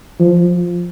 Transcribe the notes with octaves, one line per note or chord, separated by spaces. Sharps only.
F3